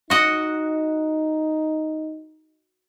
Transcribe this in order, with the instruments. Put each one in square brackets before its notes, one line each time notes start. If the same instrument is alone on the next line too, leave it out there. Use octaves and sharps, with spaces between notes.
[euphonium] D#4 [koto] F#4 D#5 F#5